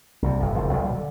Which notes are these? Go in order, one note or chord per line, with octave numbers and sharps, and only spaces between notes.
C2 C3
G1 F2 A#2 D3
F#1 D2 F3
B1 A#2 G3
D3